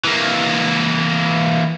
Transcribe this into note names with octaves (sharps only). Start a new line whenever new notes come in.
E3 A#3